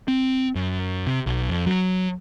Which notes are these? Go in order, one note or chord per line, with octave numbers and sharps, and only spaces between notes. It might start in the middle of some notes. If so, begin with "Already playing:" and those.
C4
F#2
C3
B1
F2
F#3